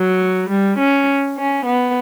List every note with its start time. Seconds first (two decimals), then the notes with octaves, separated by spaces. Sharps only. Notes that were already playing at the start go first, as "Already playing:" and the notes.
Already playing: F#3
0.49 G3
0.78 C#4
1.37 C#4
1.65 B3